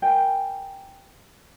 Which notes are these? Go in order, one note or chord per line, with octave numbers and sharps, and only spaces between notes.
A#4 G5 G#5